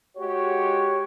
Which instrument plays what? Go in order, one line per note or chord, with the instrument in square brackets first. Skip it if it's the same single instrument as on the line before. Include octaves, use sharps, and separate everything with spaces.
[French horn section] G#3 F#4 G4 [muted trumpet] C#5